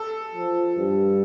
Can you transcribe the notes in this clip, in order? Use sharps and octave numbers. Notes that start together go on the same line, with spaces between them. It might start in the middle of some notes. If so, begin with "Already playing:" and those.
Already playing: A4
F3
G2